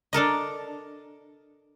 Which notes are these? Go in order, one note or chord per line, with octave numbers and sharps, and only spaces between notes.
D4 A4 A#4 D#5